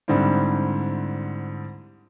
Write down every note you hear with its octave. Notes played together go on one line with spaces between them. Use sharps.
G#2 D3 G3 C4 E4